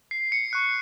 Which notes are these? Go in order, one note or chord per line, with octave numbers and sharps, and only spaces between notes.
C7
C#7
C#6 F#6